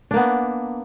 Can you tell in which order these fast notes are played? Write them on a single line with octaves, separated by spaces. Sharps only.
D4 A#3 B3